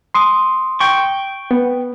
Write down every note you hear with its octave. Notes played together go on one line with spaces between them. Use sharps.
C6 D#6
G5 C#6
B3